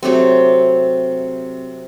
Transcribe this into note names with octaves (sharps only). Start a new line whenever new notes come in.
C3 F#3 A3 C4